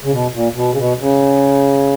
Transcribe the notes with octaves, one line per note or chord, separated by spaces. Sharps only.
C#3
B2
A#2
B2
C#3
B2
C#3